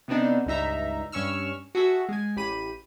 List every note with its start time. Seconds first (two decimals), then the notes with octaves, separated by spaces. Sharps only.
0.08 C3 B3 C4 D4 D#4
0.46 C#2 G2 D#4 E5 A#5
1.12 G2 C#4 C#6 E6 F6
1.75 F#4 G#4 A4 E5
2.09 G#3 G#5
2.36 A1 G4 B5 D#7